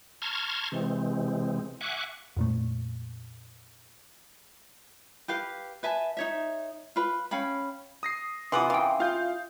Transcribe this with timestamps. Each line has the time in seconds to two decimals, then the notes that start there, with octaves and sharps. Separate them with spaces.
0.22 A5 A#5 C6 C#6 F6 G#6
0.72 C3 E3 G#3 C4
1.81 E5 F#5 G#5 C#6 D6 F#6
2.36 F2 A#2 A3
5.28 G4 B4 F5
5.83 B4 E5 G#5 A5
6.17 D#4 C#5 E5
6.96 F4 B4
7.31 C#4 F5 G5 B5
8.03 D#6 A#6 C7
8.52 C3 E3 F4 F#5 C6 D6 D#6
8.70 C#3 E3 F5 G5
9.00 F4 F5 G6